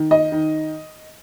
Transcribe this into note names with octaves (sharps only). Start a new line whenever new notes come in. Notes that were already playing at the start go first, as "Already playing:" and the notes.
Already playing: D#3
D#5
D#3